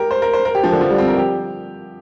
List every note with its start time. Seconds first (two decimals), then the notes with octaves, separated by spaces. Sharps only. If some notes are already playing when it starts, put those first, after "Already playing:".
Already playing: G4 A#4
0.11 C5
0.22 A#4
0.33 C5
0.45 A#4
0.55 G4
0.64 F3
0.73 D3
0.81 F3
0.90 G3
0.98 C4
1.08 A#4
1.17 G4